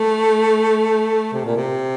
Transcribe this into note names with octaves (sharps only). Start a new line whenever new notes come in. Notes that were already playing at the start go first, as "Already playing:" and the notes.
Already playing: A3
C3
A#2
C3